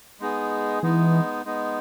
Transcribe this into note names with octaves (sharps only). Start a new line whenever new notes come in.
G#3 B3 D#4 G#4
E3 G#3 B3 D#4
G#3 B3 D#4